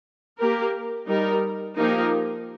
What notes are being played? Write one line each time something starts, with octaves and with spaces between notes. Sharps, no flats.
A#3 G4 A#4
G3 D#4 A#4
F3 A#3 D#4 G4 A#4